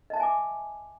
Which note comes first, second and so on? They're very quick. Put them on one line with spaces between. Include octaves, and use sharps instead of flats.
D#5 A5 E5 G#5 D6